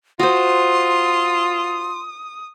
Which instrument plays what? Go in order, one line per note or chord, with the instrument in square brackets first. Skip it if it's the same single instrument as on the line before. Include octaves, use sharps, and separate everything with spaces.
[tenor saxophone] F4 [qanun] F#4 C5 [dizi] C6 [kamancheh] D#6